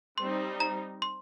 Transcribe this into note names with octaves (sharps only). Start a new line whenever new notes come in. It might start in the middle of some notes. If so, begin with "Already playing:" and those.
G3 C4 D#4 C6
A#5
C6